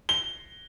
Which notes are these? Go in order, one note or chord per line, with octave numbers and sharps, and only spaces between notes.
G7